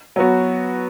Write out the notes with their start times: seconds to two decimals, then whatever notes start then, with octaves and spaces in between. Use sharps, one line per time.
0.16 F#3 B3 F#4